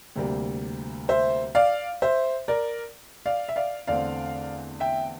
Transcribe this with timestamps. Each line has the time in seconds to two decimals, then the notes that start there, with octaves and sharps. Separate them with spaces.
0.16 D2 C3 G3 A#3
1.09 C5 E5
1.55 D5 F5
2.02 C5 E5
2.48 A#4 D5
3.26 D5 F5
3.49 E5
3.56 D5 F5
3.88 E2 D3 A3 C4 D5 F5
4.80 E5 G5